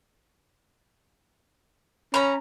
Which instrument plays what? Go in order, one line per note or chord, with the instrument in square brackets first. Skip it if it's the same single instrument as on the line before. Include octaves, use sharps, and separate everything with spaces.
[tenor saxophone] C#4 [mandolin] A#5 B5